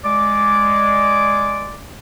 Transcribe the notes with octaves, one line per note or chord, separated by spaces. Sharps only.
G#3 D5 D6